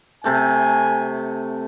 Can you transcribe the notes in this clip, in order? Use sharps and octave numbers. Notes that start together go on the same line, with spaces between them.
C3 A3 G#5 A5